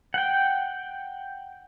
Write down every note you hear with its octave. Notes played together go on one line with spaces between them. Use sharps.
F#5 G5